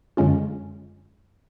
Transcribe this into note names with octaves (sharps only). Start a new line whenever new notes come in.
F#2 D3 G#3 C#4 F4